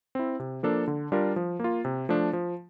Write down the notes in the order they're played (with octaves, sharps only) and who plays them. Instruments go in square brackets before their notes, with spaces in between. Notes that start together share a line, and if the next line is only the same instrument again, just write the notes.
[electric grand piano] C4 E4
C3
F3 A#3 D4 A4
D3
G3 D4 F4 A#4
F3
A#3 F4
C3
F3 A3 D4
F3